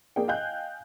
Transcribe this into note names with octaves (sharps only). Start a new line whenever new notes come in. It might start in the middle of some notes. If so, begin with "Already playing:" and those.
A#3 G#4 D5 G5
D#5 F5 G5 G#5 F#6 G6